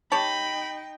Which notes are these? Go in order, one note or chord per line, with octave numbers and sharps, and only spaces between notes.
D#4 G4 C#5 G5 A5 B5